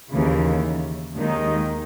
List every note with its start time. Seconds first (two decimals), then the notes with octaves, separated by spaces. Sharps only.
0.11 D#2 C#3 E3
1.14 D#2 D#3 G#3 D#4